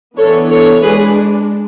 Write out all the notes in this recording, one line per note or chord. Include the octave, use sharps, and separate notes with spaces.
E3 B3 D4 A4 C#5
A4 C#5
G#3 D4 G#4 B4